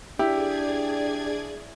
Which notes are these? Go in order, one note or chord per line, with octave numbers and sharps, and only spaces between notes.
D4 E4 G4 G#4 D5 G#6